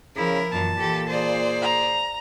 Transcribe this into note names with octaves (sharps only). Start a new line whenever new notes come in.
C#3 F3 E4 A#4
F#2 A#2 E3 A5
E3 G4 A4
G#4 C5 D5
A#5